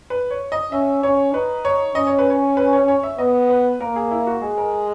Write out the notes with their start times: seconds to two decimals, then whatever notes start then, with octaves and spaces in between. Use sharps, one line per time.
0.10 B4
0.31 C#5
0.52 D#5
0.72 C#4 E5
1.03 C#4 C#5
1.33 D#4 B4
1.65 C#5
1.95 C#4 D#5
2.07 C#5
2.19 B4
2.30 C#5
2.57 B4
2.73 C#5
2.88 C#5
3.03 E5
3.18 B3 D#5
3.49 B4
3.80 A#3 A#4
3.96 G#4
4.11 E4
4.27 F#4
4.42 G#3 G#4
4.58 A#4